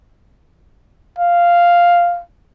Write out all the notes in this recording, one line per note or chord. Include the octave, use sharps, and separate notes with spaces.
F5